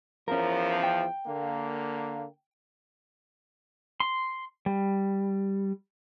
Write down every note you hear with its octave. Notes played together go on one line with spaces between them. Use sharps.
E2 F3 C#4 A#4
G5
D3 A#3
C6
G3